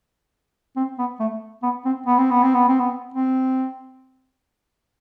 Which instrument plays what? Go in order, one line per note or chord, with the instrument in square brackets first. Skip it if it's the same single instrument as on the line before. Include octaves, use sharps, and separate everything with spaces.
[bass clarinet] C4
B3
A3
B3
C4
B3
C4
B3
C4
B3
C4
B3
C4